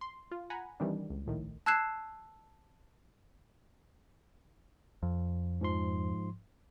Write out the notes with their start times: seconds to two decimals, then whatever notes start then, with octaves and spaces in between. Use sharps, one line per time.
0.01 C6
0.31 F4
0.50 F#5 G#5 A#5 B5
0.80 D#3 E3 G3 C4 D4
1.10 C#2
1.26 A#1 A2 D#3
1.66 A5 E6 F#6 G#6 C7 E7
5.03 F2
5.61 G#2 F3 C6